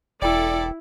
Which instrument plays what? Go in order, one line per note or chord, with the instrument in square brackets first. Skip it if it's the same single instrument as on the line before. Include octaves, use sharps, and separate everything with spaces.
[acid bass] E1 [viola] E4 [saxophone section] A4 D5 [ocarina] G5